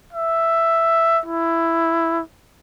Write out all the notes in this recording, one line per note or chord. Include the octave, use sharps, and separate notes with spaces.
E5
E4